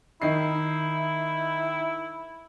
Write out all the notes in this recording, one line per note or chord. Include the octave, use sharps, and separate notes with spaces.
D#3 D#4 E4 C7